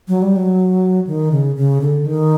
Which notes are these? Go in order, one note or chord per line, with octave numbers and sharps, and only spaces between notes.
F#3
G3
F#3
D#3
C#3
C#3
D3
D#3